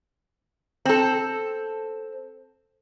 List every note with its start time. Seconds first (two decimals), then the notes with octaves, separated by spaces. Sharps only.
0.85 C4 A4